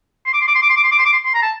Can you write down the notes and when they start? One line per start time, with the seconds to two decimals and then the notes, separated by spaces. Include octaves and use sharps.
0.26 C6
0.34 D6
0.41 C6
0.48 D6
0.55 C6
0.63 D6
0.70 C6
0.77 D6
0.84 C6
0.92 D6
0.99 C6
1.06 D6
1.13 C6
1.26 C6
1.34 A#5
1.43 A5